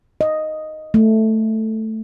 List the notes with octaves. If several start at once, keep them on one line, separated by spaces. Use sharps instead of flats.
D#5
A3